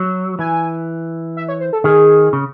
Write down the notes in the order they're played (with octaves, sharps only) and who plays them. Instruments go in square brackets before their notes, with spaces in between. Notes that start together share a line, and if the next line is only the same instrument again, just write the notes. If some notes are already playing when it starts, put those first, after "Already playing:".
Already playing: [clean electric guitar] F#3
[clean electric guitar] E3 [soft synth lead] G#5
[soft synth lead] E5
C#5
C5
A4
[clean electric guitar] D#3 [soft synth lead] G#4
[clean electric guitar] C#3